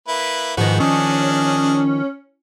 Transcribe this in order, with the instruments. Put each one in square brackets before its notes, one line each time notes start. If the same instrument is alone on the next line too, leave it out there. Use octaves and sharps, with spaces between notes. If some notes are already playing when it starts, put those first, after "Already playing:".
[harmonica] A#3 E4 B4
[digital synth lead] G#2 [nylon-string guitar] D#3 F3 [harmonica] B3 F#4
[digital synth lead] C#4 [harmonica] D4 G#4 D#5